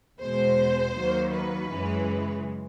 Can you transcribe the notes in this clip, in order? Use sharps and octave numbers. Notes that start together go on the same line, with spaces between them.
E2 B2 G#3 C5
D#2 D#3 F#3 A#3
B4
F#2 C#3 E3 G#3